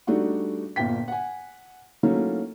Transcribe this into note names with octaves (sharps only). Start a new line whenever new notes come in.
G3 A3 D4 D#4 F#4
G1 A#2 G5 B6
F#5 G#5
F#3 A3 A#3 C#4 D#4 E4